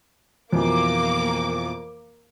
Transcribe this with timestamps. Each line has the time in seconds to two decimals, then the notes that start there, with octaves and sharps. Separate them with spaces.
0.53 F2 B2 E3 A#3 D6